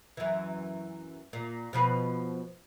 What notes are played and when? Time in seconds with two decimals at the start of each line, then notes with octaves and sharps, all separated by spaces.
0.17 F#2 E3
1.33 A#2
1.73 B2 F3 B4